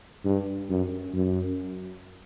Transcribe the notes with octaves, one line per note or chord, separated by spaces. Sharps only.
G2
F#2
F#2